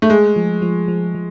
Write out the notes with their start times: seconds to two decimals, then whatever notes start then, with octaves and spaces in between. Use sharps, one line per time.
0.02 A3
0.10 G#3 G#4
0.36 F3
0.62 F3
0.88 F3
1.15 F3